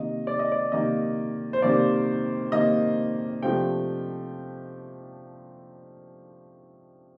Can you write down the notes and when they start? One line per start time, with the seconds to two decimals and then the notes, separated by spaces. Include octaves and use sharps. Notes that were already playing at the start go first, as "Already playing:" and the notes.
Already playing: C3 D#3 A#3 D#5
0.27 D5
0.39 D#5
0.52 D5
0.72 C3 D#3 A#3 D#5
1.53 C5
1.62 C3 D#3 A#3 D5
2.52 C3 D#3 A#3 D#5
3.43 C3 F3 A3 D4 G5